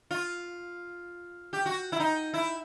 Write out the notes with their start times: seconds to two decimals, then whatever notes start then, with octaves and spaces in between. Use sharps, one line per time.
0.11 F4
1.53 G4
1.66 F#4
1.92 E4
2.00 D#4
2.34 E4